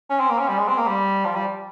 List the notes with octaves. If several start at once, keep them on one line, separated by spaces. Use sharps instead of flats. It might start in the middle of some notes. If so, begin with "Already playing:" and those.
C#4
C4
A#3
C#4
G3
G#3
C4
A#3
G3
F3
G3